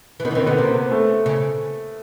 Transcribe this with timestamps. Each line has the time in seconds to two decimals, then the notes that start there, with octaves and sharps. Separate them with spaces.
0.20 E3
0.25 D#3 B3
0.31 E3
0.35 D#3 C4
0.46 D3 B3
0.58 C3 A#3
0.91 A3
1.26 C#3